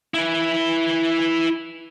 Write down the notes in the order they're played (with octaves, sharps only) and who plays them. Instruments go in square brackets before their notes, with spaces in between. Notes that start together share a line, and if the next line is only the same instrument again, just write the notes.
[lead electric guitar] E4 B4